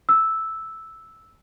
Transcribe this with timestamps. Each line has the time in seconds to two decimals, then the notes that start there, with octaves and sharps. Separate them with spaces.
0.09 E6